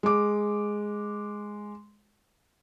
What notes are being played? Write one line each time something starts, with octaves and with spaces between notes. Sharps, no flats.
G#3 D6